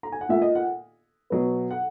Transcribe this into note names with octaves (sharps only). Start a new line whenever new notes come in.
A#5
G#5
F#5
A#2 A#3 E5
D#5
F#5
B2 F#3 B3
F#5